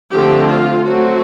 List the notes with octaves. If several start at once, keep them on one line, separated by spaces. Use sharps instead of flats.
D3 F3 A3 C4 G4
F4
F#3 A3 C4 F#4